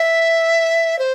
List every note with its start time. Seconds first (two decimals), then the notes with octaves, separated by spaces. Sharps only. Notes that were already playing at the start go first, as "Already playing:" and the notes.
Already playing: E5
0.99 C5